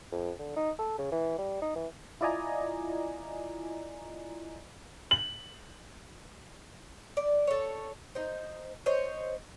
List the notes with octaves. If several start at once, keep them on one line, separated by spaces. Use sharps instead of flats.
F2
D3
D#4
A4
C#3
E3
G3
D#4
E3
E4 F4 D5 D#5 G#5 A#5
F#7
D5
A4 C#5
D#4 C5
C5 C#5 D#5